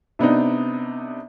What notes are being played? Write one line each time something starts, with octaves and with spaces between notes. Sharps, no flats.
C3 B3 D4 D#4